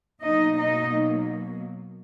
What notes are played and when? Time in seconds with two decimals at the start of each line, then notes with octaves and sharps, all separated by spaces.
0.23 B2 F#3 A#3 D#4 D#5
0.57 D#4 D#5